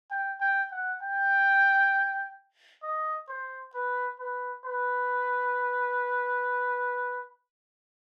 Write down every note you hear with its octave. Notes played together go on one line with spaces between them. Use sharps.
G5
G5
F#5
G5
D#5
C5
B4
B4
B4